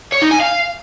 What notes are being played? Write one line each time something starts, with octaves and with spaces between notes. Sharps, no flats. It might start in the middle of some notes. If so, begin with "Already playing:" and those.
C#5
D#4
G#5
F5